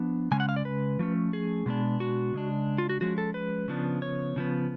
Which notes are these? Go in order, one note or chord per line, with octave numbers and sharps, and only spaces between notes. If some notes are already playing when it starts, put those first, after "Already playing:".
Already playing: F3 B3 D4
C#3 G#3 C#4 G#5
F#5
F5
D5
B4
F3 A3 C#4
G#4
B2 G#3 B3 D4
F#4
C#3 G#3 D4
F4
F#4
F3 G#3 C#4 F#4
A4
B4
C#3 F3 B3 D4
C#5
C#3 F3 B3